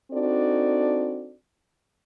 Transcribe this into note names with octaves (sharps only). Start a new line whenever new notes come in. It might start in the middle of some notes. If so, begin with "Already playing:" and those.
C4 D4 D#4 F#4 A4 D5